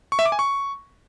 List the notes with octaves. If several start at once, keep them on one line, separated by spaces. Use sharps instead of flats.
C#6
E5
D6
G#5
C#6